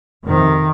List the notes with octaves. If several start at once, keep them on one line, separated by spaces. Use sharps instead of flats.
F2 C3 D#3